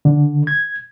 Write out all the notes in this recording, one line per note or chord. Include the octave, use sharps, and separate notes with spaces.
D3
G#6